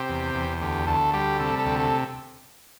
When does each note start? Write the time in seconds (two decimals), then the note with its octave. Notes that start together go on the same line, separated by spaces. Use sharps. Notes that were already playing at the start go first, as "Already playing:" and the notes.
Already playing: C3 G4 C5
0.09 E2
0.35 E2
0.62 D2 G4
0.87 D2 A4
1.14 G3 G4
1.40 C3 A4
1.59 A4
1.66 D2
1.79 A4